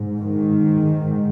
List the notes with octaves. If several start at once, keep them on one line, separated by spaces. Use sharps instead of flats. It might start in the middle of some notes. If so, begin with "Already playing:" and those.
Already playing: G#2
D#3